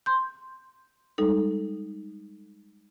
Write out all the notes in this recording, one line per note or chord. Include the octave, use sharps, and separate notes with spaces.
C6 G6
G3 G#3 D#4 A4